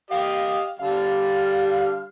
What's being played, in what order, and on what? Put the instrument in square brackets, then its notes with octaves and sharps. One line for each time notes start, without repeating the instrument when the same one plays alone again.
[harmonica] G4 D#5 [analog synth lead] F5
[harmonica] D3 G3 [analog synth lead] F5